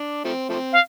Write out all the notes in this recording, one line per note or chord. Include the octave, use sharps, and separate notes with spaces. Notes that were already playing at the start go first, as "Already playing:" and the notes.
Already playing: D4
F3 A3 C4
F3 A3 C4
F5